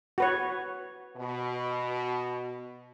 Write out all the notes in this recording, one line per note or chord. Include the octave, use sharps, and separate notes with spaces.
F#4 B4 C#5
B2